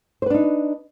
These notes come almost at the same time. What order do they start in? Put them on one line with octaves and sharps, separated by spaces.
C5 B4 D4 D#4